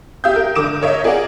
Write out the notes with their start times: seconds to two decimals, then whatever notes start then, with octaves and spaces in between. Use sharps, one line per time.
0.24 G4 E5 F5 D#6 G6
0.36 A#4
0.55 D3 A#4 D6 D#6 D7 E7
0.81 A#4 C#5 D#5 E5
1.04 F4 G#4 A#4 D5 F5 F#5